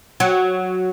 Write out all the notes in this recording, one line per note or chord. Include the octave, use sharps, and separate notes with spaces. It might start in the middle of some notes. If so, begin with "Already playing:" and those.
F#3